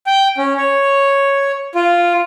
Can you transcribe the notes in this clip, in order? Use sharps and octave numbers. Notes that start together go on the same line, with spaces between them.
G5
C#4
C#5
F4